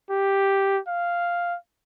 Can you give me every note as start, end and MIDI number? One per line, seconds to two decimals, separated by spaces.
0.10 0.79 67
0.88 1.56 77